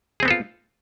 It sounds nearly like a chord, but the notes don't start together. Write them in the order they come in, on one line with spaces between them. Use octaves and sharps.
G#4 C4 B3 A4 F4